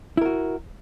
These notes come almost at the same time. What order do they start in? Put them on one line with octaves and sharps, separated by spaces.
E4 A#4 F#4